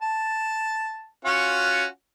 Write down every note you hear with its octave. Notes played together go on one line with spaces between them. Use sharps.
A5
C#4 F4 F#4